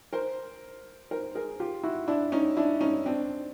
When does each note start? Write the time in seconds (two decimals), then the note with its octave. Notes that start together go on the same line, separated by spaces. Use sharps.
0.13 A#4 C5
1.11 A#4 C5
1.35 G#4 A#4
1.60 F4 G4
1.83 E4 F#4
2.08 D4 E4
2.32 C#4 D#4
2.57 D4 E4
2.81 C#4 D#4
3.06 C4 D4